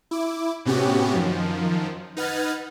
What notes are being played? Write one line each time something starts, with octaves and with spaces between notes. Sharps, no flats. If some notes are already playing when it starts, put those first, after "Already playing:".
E4 D6
A2 C3 B3 C#4 F#4 G4
F#2 D#3 F3
D#4 B4 F#5 F6 G#6 A6